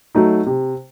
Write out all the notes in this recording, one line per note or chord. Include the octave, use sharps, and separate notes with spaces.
F#3 A3 D#4
C3